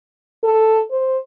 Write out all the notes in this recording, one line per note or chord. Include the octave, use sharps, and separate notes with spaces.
A4
C5